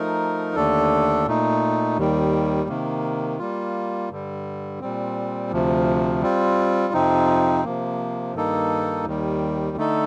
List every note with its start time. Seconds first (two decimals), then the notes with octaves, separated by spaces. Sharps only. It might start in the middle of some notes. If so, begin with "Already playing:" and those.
Already playing: F3 A3 D#4 A#4
0.56 D#2 D3 A3 D4 A4
1.26 A#2 A3 D#4
1.97 D#2 D#3 G3
2.69 C3 D#3 A#3
3.39 G3 A#3 F4
4.10 G2 D3 G3
4.81 A#2 G3 C4
5.52 D2 C3 F3
6.22 G3 C4 F4
6.93 F2 C3 F3 C4 D#4
7.64 C3 F3 A#3
8.35 G2 D#3 A#3 D#4 A4
9.05 D#2 D#3 G3
9.77 D3 A3 D#4 A4